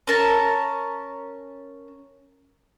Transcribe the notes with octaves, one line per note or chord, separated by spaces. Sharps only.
C#4 A#4 A5